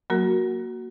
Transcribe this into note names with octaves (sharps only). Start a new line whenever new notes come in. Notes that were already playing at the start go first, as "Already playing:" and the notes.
F#3 A#3 F#4 A#4